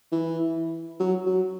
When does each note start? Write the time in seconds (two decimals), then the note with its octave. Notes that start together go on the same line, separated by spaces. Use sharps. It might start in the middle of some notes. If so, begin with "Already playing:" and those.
0.12 E3
1.00 F#3
1.26 F#3